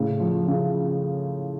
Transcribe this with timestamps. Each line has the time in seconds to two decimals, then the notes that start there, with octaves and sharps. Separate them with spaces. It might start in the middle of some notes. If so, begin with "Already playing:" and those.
Already playing: A2 C#3
0.20 F3
0.48 C#3